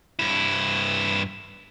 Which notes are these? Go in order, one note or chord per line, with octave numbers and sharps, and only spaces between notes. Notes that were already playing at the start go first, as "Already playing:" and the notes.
G2 E4